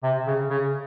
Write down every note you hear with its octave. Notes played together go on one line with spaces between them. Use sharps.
C3
C#3
C#3